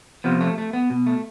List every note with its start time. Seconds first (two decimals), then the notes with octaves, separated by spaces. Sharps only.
0.24 C3 F3 B3
0.40 A3
0.58 A3
0.73 B3
0.90 B2
1.06 A3